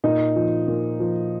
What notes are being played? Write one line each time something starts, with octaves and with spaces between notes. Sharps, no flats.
A#2 D#4
F3
A#2
F3